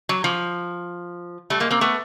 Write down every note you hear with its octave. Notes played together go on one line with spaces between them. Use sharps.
F#3
F3
G3 A3
G#3 A#3
A#3 C4
A3 B3